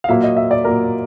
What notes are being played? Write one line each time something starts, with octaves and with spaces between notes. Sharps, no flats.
F5
A#2 F#3 A#3 E5
D#5
E5
D5
A#2 F#3 A#3 A#4